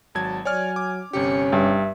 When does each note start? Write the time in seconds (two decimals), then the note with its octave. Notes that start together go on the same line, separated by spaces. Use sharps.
0.15 G#1 F#3 A5 G#6
0.45 F#3 C#5 D5 G#5 F6
0.76 D6
1.13 G1 C3 C#4 G4 C#7
1.52 G2 E5